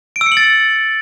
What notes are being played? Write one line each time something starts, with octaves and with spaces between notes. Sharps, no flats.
D7
E6
C#7
F#7
A6